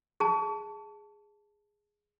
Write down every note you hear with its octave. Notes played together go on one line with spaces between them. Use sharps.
G#4 A5